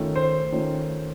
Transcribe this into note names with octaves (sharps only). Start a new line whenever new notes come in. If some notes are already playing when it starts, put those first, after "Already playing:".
Already playing: D#3 A3 C#4 F4
C5
D#3 A3 C#4 F4